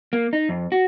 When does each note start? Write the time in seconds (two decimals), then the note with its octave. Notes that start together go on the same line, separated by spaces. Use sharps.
0.13 A#3
0.33 D#4
0.49 F2
0.72 F#4